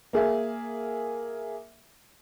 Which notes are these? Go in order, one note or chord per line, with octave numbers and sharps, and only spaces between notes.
A#3 G#4 E5